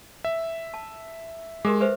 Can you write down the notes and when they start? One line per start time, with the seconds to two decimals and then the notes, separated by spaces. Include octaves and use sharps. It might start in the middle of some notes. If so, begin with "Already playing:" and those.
0.24 E5
0.74 A5
1.65 G#3 G4 A#4 D6
1.81 B4 C5 E5